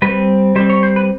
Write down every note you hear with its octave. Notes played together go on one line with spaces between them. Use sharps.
G3 C4 B4
G3 C4 C5
C#5
C5
B4